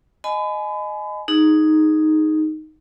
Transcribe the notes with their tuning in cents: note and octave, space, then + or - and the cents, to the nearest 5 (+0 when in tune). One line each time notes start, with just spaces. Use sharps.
D#5 -10 G#5 +30 B5 +35
D#4 +0 G#4 +5